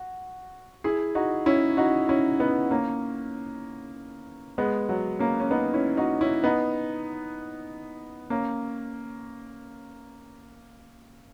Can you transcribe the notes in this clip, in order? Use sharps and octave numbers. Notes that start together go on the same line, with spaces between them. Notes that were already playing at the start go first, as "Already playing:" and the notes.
Already playing: F#4
E4 G#4
D#4 F#4
C#4 E4
D#4 F#4
C#4 E4
B3 D#4
A#3 C#4
G#3 B3
F#3
A#3 C#4
C#4
B3 D#4
C#4 E4
D#4 F#4
C#4 E4
B3 D#4
A#3 C#4